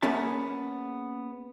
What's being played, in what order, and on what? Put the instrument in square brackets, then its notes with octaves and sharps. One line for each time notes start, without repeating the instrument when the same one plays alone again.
[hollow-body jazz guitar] A#3 B3 C#4 G#4 E5 A5